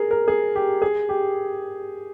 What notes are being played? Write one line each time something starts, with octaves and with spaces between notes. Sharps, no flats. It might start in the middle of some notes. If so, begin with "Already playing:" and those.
Already playing: G#4 A#4
A#4
G#4
G4
G#4
G4